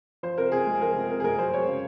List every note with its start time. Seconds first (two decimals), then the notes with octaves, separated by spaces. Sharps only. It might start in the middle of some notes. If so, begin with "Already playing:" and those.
0.23 F3 C5
0.38 C3 A#4
0.52 C3 G#4
0.67 G#3
0.81 F3 A#4
0.95 C3
1.10 C3 A#4
1.20 G#4
1.24 G#3 A#4
1.39 F#3 C5
1.53 F#3 C#5
1.67 C#3